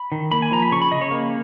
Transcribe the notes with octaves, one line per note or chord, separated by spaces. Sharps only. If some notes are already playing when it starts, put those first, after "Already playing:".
Already playing: B5
D#3
A#3 B5
G#5
F3 A#5
B5
C#3 C#6
B5
C#3 D#5
C#5
A#3